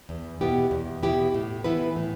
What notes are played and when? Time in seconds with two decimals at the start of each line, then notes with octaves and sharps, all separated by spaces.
0.09 E2
0.41 B2 B3 E4 G4
0.71 E2
1.03 B2 B3 E4 G4
1.34 A2
1.64 E3 B3 E4 B4
1.96 A2